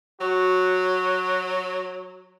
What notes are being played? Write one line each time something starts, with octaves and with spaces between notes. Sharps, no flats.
F#3 F#4